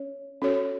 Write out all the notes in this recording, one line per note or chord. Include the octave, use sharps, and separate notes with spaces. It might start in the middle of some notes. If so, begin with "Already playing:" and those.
Already playing: C#4 C#5
C#4 F#4 A4 C#5